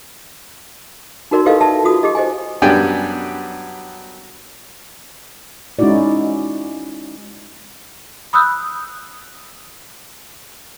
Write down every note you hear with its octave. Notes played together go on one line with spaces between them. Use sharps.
D#4 F#4 A#4 D5 C6
E4 G4 A4 B4 D#5 F5
D5 E5 A5
F4 F#4 D#6
G4 G#4 D#5
C5 D#5 G#5
F#2 G3 B3 D4 G5 G#5
G#3 C#4 D#4 E4 F#4 D5
B5 D#6 E6 F#6 G6